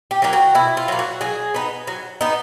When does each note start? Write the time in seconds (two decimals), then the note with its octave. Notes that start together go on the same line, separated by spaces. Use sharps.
0.11 G4
0.22 F#3 A#3 G4
0.33 F#4
0.55 B2 E4
0.77 F4
0.88 F#3 A#3
0.99 F#4
1.21 F#3 G#4
1.54 B3 D#4
1.87 F#3
2.21 B3 D#4